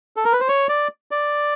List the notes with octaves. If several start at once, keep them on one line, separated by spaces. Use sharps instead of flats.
A4
A#4
B4
C5
C#5
D5
D5